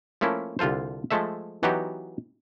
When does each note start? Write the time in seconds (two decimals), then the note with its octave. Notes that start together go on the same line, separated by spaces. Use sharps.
0.21 F3 A3 A#3 C#4 E4
0.59 C2 D3 F4 A4 C5
1.11 F3 G#3 A3 A4 E5
1.63 E3 F#3 B3 D#4 F#4 G4